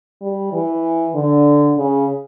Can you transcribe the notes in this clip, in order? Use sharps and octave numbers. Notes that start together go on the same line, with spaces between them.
G3
E3
D3
C#3